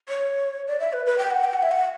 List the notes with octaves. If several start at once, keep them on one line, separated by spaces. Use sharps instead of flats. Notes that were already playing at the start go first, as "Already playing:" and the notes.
C#5
D5
E5
B4
B4
G5
F#5
G5
F#5
E5
F#5